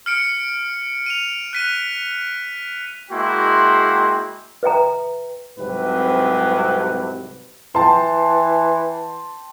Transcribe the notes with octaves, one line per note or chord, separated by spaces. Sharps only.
F6 C#7 D7
D#7 F7
F#6 B6 D#7
G#3 A#3 E4 F#4 G5 C6
B4 E5 G5 A#5
C2 G#2 C3 F#3 B4
E3 G5 A5 C6